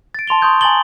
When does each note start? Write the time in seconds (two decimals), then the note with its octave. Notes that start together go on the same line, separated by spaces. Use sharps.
0.15 A6 D7
0.28 A5 C6 F7 G7
0.42 C6 C#6 D#6 G6 G#6
0.61 G#5 A#5 C6 A6 F#7 G7